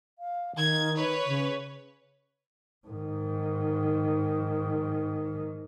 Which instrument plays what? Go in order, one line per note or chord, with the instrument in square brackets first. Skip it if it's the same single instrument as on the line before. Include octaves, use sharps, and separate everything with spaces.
[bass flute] F5
[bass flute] D#3 [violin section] G#6
[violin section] B4 C#5
[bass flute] C#3
[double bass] G#2 D#3